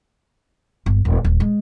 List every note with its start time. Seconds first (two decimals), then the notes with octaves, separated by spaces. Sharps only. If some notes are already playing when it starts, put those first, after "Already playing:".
0.86 G1
1.05 D#1
1.24 D#1
1.40 G#3